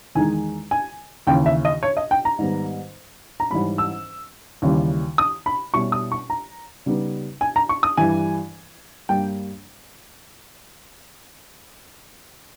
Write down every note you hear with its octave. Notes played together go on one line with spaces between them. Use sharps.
E2 D#3 G#3 D#4 G#5
G#5
D#2 C#3 E3 G5
E5
D#5
C#5
D#5
G5
A#5
G#2 D#3 G3 B3
A#5
G#2 E3 G3 C#4 B5
E6
D#2 C#3 E3 G3
D#6
B5
B2 G3 C#4 E4 C#6
D#6
C#6
A#5
C#3 G3 B3 D#4
G#5
A#5
C#6
D#6
G2 E3 G3 G#5
G2 G3 A#3 G5